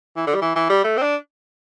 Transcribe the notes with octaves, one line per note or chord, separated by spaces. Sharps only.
E3
D3
G3
E3
E3
G3
A3
C4
D4